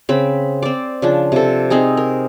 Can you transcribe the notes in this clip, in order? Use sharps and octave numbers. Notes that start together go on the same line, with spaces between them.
C#3 C4 B5
C4 D5
C#3 F3 D4
C3 A4
C4 D#4 G#4 A#5
A#4